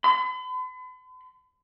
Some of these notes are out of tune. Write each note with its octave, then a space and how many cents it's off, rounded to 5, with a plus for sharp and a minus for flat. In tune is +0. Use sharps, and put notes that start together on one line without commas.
B5 +45